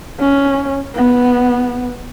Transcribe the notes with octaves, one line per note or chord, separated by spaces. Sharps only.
C#4
B3